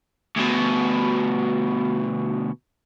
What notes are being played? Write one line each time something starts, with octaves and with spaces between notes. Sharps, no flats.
D2 B2